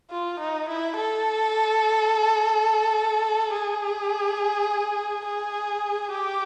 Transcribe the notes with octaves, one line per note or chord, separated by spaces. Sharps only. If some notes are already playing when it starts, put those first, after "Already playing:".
F4
D#4
E4
A4
G#4
G#4
G4